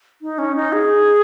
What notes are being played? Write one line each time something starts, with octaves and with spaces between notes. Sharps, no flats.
D#4
C#4
D#4
G#4